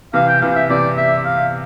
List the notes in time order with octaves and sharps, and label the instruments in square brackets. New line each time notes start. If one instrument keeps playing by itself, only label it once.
[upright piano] C3 E3 [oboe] F5
[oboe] G5
[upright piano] C3 E3 [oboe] F5
[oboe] E5
[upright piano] C3 E3 [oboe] D5
[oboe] E5
F5